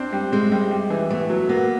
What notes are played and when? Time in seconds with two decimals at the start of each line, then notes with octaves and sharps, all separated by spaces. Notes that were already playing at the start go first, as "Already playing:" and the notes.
Already playing: C4 D4
0.12 G3
0.32 G#3 C4
0.52 G3
0.71 G3
0.90 E3
1.10 A3 B3
1.30 F#3
1.49 A#3 B3